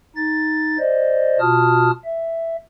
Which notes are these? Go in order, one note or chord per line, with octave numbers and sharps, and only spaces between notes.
D#4 A6
C5 D5 D#5
B2 F4 F#4 A5 D#6 F6
E5